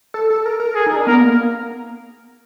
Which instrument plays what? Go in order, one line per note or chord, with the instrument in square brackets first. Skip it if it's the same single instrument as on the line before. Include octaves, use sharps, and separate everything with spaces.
[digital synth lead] A4
A4
A#4
A#4
[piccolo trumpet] G#4 [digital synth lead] A4
[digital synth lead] D#4
D4
[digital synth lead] B3 [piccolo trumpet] A#4
[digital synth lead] A#3